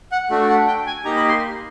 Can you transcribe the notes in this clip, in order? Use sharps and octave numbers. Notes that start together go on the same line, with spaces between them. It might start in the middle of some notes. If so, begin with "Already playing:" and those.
F#5
A3 D4 F#4
F#5
G5
G#5
A#3 D#4 G4 A#5
B5
C6